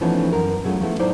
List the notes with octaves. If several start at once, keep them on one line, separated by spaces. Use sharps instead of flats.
E3 F3 A3 B3 C#4 D#4
F#2 A#4
F#3 G#3 A3 C#4 F4
F3 A3 B3 E4
A2 F#3 D#4 E4 C5 D5